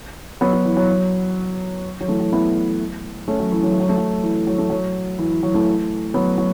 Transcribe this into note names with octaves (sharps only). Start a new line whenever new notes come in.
F#3 B3
F#3
E3
F#3
F#3
E3 A3
F#3
B3 E4
A3 C#4
F#3
E3
F#3
A3
F#3
A3
F#3
E3
F#3
A3
F#3
E3
E3
F#3
E3 A3
F#3 B3
F#3